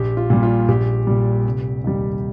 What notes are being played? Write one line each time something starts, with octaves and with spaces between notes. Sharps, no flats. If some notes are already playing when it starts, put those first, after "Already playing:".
Already playing: A#1 G4
F4
A#2 G3
F4
A#1 G4
A#2 G3
F1
D#2 D#3 G3